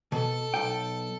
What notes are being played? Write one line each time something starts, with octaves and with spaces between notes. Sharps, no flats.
B2 A4
B1 G5